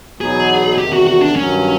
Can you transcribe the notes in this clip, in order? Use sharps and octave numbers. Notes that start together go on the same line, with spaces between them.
E2 B2 F#3 B3 D#4 G#4
E2 C3 D#3 G4
F#4
F#4
D4
G2 D#3 F#3 C#4